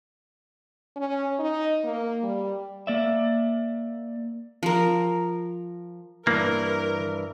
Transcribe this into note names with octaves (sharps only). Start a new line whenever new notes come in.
C#4
D#4
A#3
G3
A#3 D5 E5
F3 A#4
G2 E3 A#3 A#4